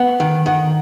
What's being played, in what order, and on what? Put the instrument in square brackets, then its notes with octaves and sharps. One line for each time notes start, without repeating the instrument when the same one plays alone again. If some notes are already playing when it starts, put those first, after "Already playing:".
Already playing: [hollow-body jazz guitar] B3 [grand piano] F#5
[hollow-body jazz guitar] D#3 [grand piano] F#5
[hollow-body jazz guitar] D#3 [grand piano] F#5